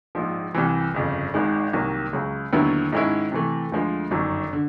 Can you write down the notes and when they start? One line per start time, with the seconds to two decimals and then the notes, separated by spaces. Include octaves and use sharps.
0.15 A#1 G#2 F3
0.54 C2 C3 E3
0.94 G1 F2 C#3
1.34 G#1 G#2 D#3 G#3
1.73 C2 C3 D#3 F#3 A#3
2.13 C#2 C#3 F#3
2.52 D#2 D3 F#3 B3 E4
2.93 G#2 D#3 G#3 C#4 E4
3.32 C3 E3 A3
3.72 D2 D3 F3 G#3
4.11 G1 F#2 D#3 F#3
4.53 D3